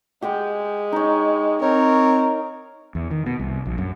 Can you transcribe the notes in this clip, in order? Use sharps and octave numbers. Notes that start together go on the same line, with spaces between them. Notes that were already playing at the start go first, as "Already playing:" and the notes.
G#3 G4 F#5 G5
D#4 C#5
C4 D#4 A#4 C#5
E2
D#3
B2
C2
A#1
F#2